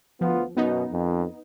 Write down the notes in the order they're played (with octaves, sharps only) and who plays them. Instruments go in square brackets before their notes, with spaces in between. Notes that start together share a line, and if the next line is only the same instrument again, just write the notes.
[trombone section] D2 B3 F4 [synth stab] F3
[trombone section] F#2 B2 [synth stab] B3 D#4
[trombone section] F2